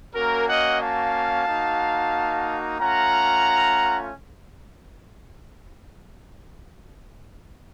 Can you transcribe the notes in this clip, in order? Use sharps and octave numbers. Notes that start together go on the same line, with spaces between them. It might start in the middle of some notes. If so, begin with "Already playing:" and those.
A#3 C#4 F#4 A#4
D#5 F#5
F5 A5
A#3 D#4 F#4
A3 C#4 F4 F#5 A#5